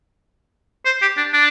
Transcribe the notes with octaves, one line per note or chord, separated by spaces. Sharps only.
C5
G4
D4
D4